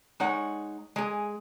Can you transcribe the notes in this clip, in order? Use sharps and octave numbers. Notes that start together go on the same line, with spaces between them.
G#3 D#4 C#5 F#5
G#3 G#4